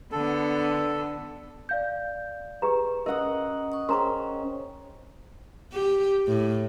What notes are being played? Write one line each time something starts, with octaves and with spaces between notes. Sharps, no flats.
D3 B3 A4
D5 F5 G6
G4 G#4 B4 A#5
C#4 A#4 D#5 F#5 A#5 D#6
C#6 D#6
C#4 G#4 A#4 C5 G5 A#5 C6
G4
A2